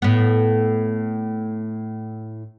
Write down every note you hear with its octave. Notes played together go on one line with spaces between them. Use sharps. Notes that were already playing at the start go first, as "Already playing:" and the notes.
A2 B3